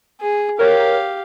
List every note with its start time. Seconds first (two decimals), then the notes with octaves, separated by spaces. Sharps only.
0.21 G#4
0.59 G4 A#4 C#5 F5